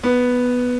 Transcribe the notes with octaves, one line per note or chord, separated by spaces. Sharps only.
B3